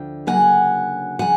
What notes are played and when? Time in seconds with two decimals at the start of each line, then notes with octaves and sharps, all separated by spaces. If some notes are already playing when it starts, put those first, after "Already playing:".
Already playing: D2 D3 F3 G5
0.27 D2 C#3 F#3 A#3 F#5 G#5
1.19 C#3 F3 F#5 G#5